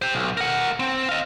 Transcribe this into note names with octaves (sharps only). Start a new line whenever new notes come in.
G4 C5
B1
A#4 F#5
C4
D#5 F5